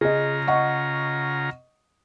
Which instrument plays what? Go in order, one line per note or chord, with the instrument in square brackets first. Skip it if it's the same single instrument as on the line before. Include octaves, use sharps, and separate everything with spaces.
[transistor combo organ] C#3 F4 A#5 [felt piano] G#4 D#5
[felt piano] D#5 F#5 C#6